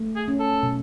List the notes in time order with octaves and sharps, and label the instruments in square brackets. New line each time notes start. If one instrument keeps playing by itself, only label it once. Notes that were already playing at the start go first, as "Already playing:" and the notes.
Already playing: [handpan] A3
[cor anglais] G#4
[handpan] C#4
[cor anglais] A4
[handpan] B2